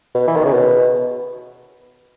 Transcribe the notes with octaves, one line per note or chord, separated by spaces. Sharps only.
B2
E3
D#3
C#3
B2